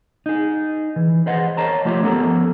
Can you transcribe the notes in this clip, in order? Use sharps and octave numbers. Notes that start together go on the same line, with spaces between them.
D#4 G#4
E3
G#4 B4 C5 D#5 F#5
A#4 C#5 D#5 A5 A#5
F3 A3 F4 G4 C#5
F3 B3 C#4 A4 A#4 A#5